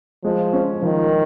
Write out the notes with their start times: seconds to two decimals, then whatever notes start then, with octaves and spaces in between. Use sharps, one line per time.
0.24 F3 G#3
0.53 C#4
0.82 D#3 F3